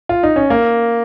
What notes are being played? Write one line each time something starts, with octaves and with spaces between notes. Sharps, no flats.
F4
D#4
C#4
A#3